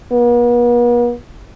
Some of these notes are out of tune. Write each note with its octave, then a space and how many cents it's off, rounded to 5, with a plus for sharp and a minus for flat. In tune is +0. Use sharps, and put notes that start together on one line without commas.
B3 -45